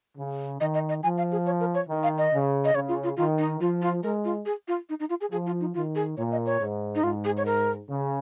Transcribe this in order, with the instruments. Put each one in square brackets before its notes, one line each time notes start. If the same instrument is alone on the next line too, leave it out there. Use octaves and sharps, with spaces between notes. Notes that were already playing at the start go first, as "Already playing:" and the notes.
[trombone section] C#3
[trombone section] D#3 [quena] D#5
[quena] D#5
D#5
[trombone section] F3 [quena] G#5
[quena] F5
G#4
C#5
A#4
C#5
[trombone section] D#3
[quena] F5
D#5
[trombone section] C#3
[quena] D#5
[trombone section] C#3 [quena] C#5
[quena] F4
F4
[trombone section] D#3 [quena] F4
[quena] D#4
[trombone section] F3 [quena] F4
[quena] F4
[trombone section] G#3 [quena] A#4
[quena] F4
G#4
F4
D#4
D#4
F4
G#4
[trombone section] F3 [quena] G#4
[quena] F4
D#4
[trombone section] D#3 [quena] F4
[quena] G#4
[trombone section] A#2 [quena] C#5
[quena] D#5
C#5
[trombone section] G#2
[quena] D#4
[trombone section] G#2 [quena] F4
[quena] G#4
C#5
A#4
[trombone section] C#3